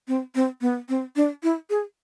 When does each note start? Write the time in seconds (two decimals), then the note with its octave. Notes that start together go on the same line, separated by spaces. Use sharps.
0.08 C4
0.35 C4
0.61 B3
0.89 C4
1.16 D4
1.43 E4
1.70 G#4